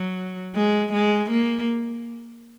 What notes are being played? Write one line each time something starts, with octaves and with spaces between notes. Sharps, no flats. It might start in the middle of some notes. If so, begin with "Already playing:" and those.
Already playing: F#3
G#3
G#3
A#3